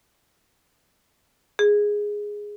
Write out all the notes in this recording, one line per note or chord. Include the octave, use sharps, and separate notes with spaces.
G#4